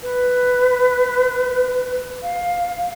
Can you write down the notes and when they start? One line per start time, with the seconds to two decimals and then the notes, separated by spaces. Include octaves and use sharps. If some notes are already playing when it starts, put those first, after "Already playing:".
0.03 B4
2.22 F5